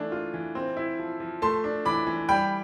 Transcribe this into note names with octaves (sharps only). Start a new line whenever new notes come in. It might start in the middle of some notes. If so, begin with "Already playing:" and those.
Already playing: E3 A3 D4
F4
E3
C4
E4
F3
F3
A3 A5 C6
D4
E3 B5 D6
E3
G3 G5 B5